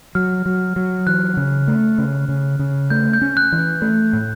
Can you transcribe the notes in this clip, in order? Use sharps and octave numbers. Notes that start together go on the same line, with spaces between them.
F#3 F6
F#3
F#3
E3 F#6
C#3
A3
C#3
C#3
C#3
A3 G6
G6
C#4
F#6
E3
G6
A3
A2